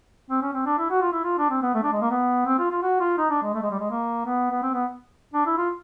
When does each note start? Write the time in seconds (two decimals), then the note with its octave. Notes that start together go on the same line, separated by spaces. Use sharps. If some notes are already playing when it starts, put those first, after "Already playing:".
0.31 C4
0.42 C#4
0.53 C4
0.66 D4
0.78 E4
0.90 F#4
1.02 F4
1.12 E4
1.24 F4
1.39 D4
1.50 C4
1.62 B3
1.74 A3
1.84 D4
1.93 G#3
2.02 A#3
2.11 B3
2.46 C4
2.59 F4
2.71 F4
2.83 F#4
3.00 F4
3.18 D#4
3.30 D4
3.43 G#3
3.54 A3
3.63 G#3
3.71 G3
3.79 G#3
3.90 A#3
4.26 B3
4.51 B3
4.62 C4
4.74 B3
5.34 D4
5.46 E4
5.58 F4